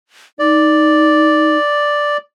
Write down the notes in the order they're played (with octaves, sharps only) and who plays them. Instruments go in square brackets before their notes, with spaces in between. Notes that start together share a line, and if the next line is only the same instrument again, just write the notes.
[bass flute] D#4 [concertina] D5